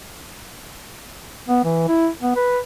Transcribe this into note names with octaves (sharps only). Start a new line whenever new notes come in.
B3
E3
E4
B3
B4